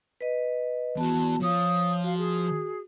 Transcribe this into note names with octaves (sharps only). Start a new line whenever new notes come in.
B4 D#5
E2 B3 F#4 A5
F3 C#5 F5 D#6
F#4 F5
G#4